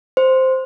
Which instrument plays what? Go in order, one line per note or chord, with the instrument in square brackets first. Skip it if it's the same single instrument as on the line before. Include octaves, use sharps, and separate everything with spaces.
[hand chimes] C5